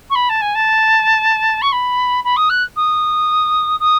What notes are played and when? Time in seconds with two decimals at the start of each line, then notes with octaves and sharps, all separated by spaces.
0.10 C#6
0.15 B5
0.29 A5
0.41 G#5
0.55 A5
1.62 C#6
1.72 B5
2.24 B5
2.36 D#6
2.50 F#6
2.76 D#6
3.80 D#6